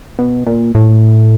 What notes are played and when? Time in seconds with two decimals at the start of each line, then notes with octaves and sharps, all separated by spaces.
0.19 B2
0.47 A#2
0.75 A2